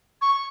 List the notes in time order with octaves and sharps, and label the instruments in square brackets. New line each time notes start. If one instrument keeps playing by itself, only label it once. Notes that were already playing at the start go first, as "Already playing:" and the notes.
[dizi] C#6